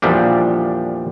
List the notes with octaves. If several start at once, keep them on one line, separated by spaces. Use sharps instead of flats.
E2 A#2 F3 G3 D4